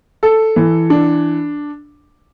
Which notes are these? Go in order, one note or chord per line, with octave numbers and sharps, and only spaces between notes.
A4
E3
D4